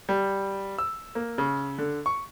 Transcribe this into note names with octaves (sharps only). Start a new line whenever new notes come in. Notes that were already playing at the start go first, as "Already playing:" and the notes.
G3
E6
A#3
C#3
D3
C#6